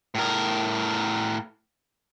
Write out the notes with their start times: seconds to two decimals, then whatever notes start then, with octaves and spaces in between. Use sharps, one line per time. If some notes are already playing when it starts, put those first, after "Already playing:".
0.15 A2 A#4